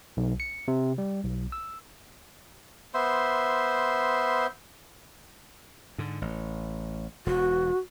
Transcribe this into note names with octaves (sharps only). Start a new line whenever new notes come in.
B1
C#7
C3
G3
B1
E6
B3 C5 E5 C6
G#2 D3
A1
E1 B2 F#4